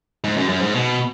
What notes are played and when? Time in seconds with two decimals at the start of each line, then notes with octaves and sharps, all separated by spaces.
0.24 G#2
0.37 F#2
0.49 F#2
0.62 G#2
0.74 B2